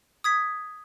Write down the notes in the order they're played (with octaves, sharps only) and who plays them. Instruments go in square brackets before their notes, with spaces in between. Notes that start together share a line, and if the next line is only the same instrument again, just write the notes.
[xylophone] D#6 G#6 B6